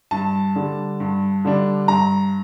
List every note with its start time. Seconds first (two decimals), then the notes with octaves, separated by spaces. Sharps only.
0.11 G2 A5
0.55 D3 G3 D4
1.00 G2
1.45 D3 G3 D4
1.88 G2 A#5